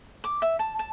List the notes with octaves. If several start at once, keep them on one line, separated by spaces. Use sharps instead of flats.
D6
E5
A5
A5